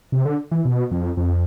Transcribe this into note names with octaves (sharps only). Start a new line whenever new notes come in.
C3
D3
E3
B2
F2
F2